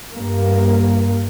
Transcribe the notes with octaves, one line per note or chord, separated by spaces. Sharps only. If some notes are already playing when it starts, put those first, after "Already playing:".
G2 A#3